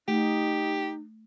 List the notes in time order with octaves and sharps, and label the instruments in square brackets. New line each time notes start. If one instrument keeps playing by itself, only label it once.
[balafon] A3 [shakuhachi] D#4 [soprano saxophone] G4